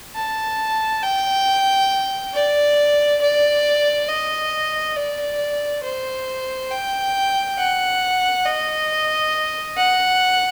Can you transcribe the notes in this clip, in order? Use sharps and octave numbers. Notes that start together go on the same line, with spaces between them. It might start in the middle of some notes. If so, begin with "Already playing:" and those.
A5
G5
D5
D5
D#5
D5
C5
G5
F#5
D#5
F#5